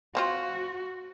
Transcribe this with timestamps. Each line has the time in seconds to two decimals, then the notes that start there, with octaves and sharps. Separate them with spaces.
0.15 F3 C4 F4 F#4